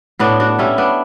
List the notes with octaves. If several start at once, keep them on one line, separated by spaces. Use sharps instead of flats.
A2 B3 D4
D4 F#4
G3 C#4 E4
B3 D4